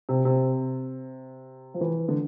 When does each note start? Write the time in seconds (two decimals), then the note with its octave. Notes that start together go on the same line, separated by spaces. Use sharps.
0.09 C3
0.25 C3
1.74 F3
1.81 E3
2.09 D3